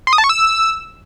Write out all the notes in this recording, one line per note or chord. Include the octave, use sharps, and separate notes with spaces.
C6
D#6
A5
C#6
E6